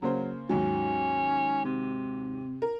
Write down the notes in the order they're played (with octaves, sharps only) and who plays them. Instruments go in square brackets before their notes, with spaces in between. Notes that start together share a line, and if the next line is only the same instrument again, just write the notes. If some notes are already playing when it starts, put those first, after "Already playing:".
[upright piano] C#3 A#3 C5 [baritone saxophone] F#3
[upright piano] D#2 G#2 F#3 [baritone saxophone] C#4
[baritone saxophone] C3
[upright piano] A#4